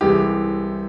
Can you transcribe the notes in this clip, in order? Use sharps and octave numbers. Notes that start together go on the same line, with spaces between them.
C2 C3 E3 G#3 G4